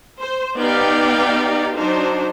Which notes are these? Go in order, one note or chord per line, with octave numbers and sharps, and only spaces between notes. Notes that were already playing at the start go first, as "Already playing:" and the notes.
C5
B3 D#4 G4 D5 F5 G5
F#3 D4 D#4 C5